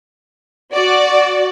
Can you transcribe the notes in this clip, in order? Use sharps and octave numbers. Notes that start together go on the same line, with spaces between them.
F#4 D5